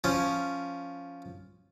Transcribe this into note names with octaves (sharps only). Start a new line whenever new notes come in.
F3 C#4